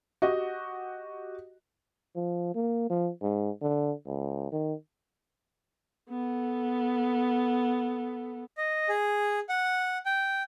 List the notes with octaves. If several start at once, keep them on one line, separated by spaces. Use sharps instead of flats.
F#4 G4 D#5
F3
A#3
F3
G#2
D3
C#2
D#3
B3 A4
D#5
G#4
F#5
G5